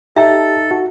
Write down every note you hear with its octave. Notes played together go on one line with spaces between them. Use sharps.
D#4 G4 A4 E5 A5
F#4